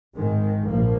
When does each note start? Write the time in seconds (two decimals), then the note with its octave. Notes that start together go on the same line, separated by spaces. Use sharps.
0.15 G#1 G#2 D#3 G#3
0.68 A#1 G#2 F3 A#3